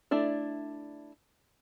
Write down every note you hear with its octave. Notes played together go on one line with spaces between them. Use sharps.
A3 D4 E4 D5